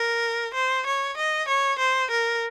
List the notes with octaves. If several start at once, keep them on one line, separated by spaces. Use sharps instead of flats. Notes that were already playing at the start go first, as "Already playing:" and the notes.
Already playing: A#4
C5
C#5
D#5
C#5
C5
A#4